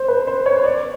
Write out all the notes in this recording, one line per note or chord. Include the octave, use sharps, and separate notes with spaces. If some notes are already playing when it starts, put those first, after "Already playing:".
Already playing: C5
B4
C5
C#5
D5